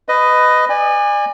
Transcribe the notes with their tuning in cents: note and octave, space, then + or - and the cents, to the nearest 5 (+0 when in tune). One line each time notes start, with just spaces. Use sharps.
B4 +15 D#5 +0
D5 +25 G#5 -25